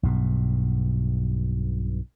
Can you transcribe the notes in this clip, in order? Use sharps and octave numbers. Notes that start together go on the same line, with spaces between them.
B1 G2 B2